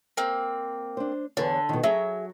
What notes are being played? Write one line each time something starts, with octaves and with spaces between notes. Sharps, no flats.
A#3 C4
D4 C5
E2 D3 B4 C#5
B2 D#3
F#3 G#4 E5